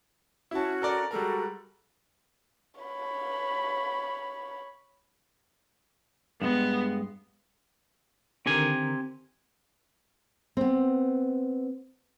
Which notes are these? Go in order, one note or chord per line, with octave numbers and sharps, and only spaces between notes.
C#4 E4 F#4 A5
A4 A#4 D5
G3 G#3 F#4 A4 A#4
C#5 B5
G2 G#3 B3
D3 D#3 C4 G4 A#4 G#5
B3 C4